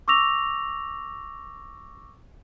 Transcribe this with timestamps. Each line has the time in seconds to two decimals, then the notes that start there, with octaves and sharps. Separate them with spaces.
0.08 C#6 D6 E6 A#6 F7